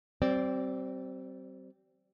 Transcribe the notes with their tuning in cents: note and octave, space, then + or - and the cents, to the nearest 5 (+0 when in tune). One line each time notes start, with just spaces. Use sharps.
G3 -45 C4 +0 D5 -10